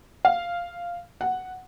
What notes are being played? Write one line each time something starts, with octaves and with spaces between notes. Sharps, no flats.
F5
F#5